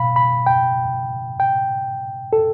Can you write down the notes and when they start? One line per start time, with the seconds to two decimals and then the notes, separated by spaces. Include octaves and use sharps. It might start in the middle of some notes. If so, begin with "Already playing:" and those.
Already playing: B2 F5 B5
0.16 B5
0.47 G5
1.40 G5
2.33 A4